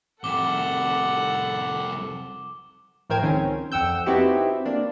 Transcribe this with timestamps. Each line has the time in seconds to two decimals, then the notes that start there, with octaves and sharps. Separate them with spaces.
0.24 C2 F2 A4 F#5 D6 G7
3.10 A2 F3 A#4 C5 G5 G#6
3.22 C#2 D#3 C4 C#4
3.72 F2 F#5 G5 E6 G6
4.06 B3 C4 D#4 E4 F#4 G4
4.66 A#3 D4